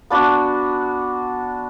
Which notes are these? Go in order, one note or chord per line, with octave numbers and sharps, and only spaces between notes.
B3 D4 F#4